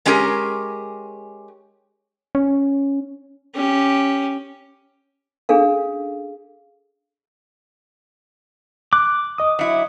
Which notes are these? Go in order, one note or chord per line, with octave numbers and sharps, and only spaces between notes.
G#3 C#4 G4 G#4 A#4
C#4
C#4 G4
C#4 D4 G#4 A4 F5
D6 F#6
D#5 D#6
F#3 E4